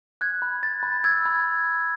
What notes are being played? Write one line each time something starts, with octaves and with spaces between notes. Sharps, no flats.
F#6 G#6
B5
F#6 A6
B5
E6 G#6
B5